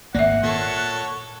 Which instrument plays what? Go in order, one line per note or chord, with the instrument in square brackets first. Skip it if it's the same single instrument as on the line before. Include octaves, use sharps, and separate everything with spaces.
[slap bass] G#1 A#3 [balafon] D5 E5 [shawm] F#5
[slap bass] A#2 [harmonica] A4 C#5